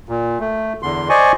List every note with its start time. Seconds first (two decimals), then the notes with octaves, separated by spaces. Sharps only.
0.09 A#2
0.40 A3
0.83 E2 D3 C6
1.09 C5 D5 D#5 G#5 C#6